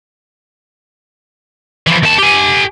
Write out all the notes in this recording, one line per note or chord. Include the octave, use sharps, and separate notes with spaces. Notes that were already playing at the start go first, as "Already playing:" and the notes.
E3 F3
D#2 A5
G4 G#5